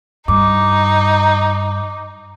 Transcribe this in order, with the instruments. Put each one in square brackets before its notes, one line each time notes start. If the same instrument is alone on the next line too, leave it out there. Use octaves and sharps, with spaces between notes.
[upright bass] G2 [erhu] D#4 [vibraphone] D6